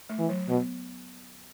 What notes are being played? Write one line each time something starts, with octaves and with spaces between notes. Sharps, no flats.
A3
E3
F#3
B2 B3